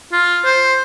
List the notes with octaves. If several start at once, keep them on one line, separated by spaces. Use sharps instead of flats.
F4
C5